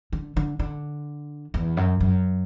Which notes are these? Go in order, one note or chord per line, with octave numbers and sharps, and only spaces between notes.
D3
D3
D3
E2
F#2
F#2